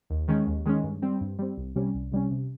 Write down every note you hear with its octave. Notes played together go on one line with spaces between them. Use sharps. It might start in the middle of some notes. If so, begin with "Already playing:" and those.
D#2
D#3 G#3 C#4
D#2
D#3 G#3 C#4
G2
G3 C4
G2
G3 C4
C2
C3 G3 C#4
C2
C3 G3 C#4
C3